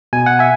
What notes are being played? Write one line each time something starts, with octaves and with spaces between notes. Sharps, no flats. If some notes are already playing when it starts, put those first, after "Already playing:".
B2 G#5
F#5
E5 G#5